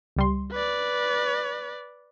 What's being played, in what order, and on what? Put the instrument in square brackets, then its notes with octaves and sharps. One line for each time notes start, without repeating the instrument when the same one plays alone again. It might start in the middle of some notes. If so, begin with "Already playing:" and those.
[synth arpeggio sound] C#2 G3 C6
[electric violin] B4 D5